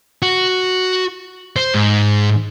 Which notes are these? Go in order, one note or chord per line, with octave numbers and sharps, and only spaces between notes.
F#4
C5
G#2